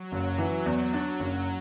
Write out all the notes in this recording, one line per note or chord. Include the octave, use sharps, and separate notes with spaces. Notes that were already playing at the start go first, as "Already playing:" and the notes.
Already playing: F#3
F#1
E3
E2
D4
F#1